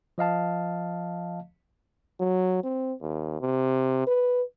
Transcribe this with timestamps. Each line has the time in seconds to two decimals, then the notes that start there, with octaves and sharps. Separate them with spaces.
0.18 F3 D#5 F5 A5
2.20 F#3
2.63 C4
3.01 D#2
3.40 C3
4.07 B4